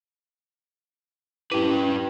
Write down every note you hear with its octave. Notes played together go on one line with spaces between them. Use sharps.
C#4 E4 G4 B4